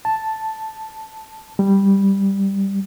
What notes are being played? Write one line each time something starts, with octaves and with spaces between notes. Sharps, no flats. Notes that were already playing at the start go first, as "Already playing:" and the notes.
A5
G3